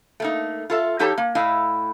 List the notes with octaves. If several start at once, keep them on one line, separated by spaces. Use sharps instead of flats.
A3 A#3 D#4
F4 A4 E5
F3 D#4 G4 A4 C#5 A5
A#3
A2 E4 D#5 F5